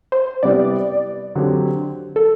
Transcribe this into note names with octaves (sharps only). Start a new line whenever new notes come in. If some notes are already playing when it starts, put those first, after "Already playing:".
C5
C3 G3 B3 E4 G4 D5
D3 F#3 C4 G4
A4